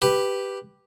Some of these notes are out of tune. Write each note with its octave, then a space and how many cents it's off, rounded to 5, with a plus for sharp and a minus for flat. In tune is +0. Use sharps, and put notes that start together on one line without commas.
G4 +0 B4 +0